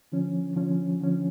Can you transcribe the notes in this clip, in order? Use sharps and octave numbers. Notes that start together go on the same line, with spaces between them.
D3 F3 C#4
D3 F3 C#4
D3 F3 C#4